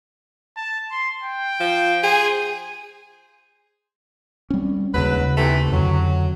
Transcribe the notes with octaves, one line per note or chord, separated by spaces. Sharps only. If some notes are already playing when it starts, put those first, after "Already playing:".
A5
C6
G5
F3
G#4 C5
G3 C4 C#4
D#2 G#2 C#3 F#3 B4
C3 E3 A3
F2 D3 F#3